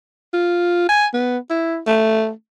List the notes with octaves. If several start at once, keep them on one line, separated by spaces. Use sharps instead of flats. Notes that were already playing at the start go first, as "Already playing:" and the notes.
F4
G#5
B3
E4
A3